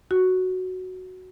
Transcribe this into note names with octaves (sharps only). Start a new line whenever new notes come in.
F#4